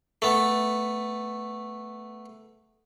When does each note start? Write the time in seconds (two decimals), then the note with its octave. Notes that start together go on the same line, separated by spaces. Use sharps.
0.22 A3 B3